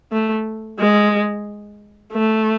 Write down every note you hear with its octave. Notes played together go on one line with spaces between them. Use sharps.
A3
G#3
A3